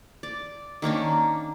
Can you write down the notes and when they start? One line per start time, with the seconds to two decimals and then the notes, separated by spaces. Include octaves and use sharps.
0.23 D5
0.82 D#3 A#3 C#4 D4